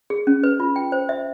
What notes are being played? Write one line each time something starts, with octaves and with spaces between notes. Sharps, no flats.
G#4
C#4
B4
F4
G5
C5
E5